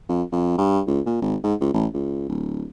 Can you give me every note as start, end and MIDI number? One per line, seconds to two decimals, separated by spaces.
0.09 0.23 41
0.32 0.54 41
0.58 0.81 43
0.87 1.00 37
1.06 1.19 46
1.22 1.36 32
1.44 1.54 44
1.61 1.70 37
1.74 1.87 33
1.94 2.24 37
2.29 2.65 26